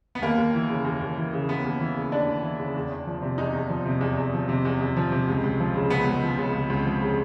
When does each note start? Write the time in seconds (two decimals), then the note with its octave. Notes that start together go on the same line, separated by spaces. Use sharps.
0.15 B3
0.22 D#2 A#3
0.38 D#2
0.54 E3
0.70 C#3
0.85 D#2
1.01 D#2
1.18 E3
1.33 C#3
1.48 D#2 B3
1.65 D#2
1.81 E3
1.96 C#3
2.11 D#2 D4
2.28 D#2
2.43 E3
2.59 C#3
2.75 E2
2.90 E2
3.07 F3
3.22 C3
3.38 E2 D#4
3.54 E2
3.69 F3
3.86 C3
4.01 E2
4.17 E2
4.34 F3
4.49 C3
4.65 E2
4.81 E2
4.97 F3
5.12 C3
5.28 C#2
5.44 C#2
5.60 F3
5.75 C#3
5.90 C#2 B3
6.07 C#2
6.23 F3
6.38 C#3
6.54 C#2
6.70 C#2
6.86 F3
7.02 C#3